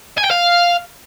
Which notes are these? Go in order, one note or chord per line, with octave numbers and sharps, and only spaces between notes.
G#5
G5
F5